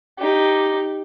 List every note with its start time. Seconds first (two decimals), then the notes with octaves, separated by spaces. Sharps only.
0.18 D#4 G4